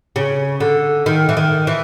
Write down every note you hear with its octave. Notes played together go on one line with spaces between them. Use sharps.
C#3
D3
D#3
E3
D#3
E3